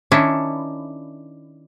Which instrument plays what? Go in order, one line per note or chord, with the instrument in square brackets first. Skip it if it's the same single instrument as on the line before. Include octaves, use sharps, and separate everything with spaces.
[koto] D#3 C#4 D4 E4